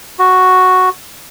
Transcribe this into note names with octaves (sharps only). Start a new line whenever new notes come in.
F#4